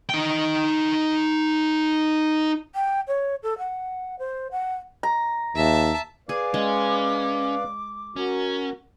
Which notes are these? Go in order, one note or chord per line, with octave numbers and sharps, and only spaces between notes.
D#4 G5
G5
C#5
A4
F#5
C5
F#5
A#5
D#2 E5 A5
G#4 B4 D5 F5 D6
G#3 C#4
C#4 F#4 A#4